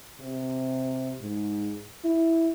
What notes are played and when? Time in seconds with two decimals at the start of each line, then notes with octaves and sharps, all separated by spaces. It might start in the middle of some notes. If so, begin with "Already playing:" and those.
0.21 C3
1.21 G#2
2.05 E4